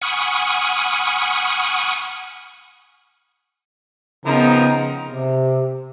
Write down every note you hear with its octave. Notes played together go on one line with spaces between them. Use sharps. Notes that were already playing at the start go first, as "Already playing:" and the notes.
F#5 G#5 B5 C#6 D#6 F6
C#3 F3 B3 C4 D#4 A#4
C3